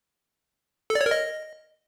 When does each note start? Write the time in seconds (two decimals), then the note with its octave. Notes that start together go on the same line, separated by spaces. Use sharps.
0.90 A4
0.95 D5
1.01 C#5
1.06 A#4
1.11 D#5